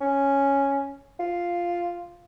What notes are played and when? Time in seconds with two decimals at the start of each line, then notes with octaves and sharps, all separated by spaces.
0.01 C#4
1.20 F4